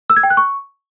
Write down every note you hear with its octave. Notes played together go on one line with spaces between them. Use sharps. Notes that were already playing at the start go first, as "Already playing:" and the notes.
E6
G#6
G5
F#6
C#6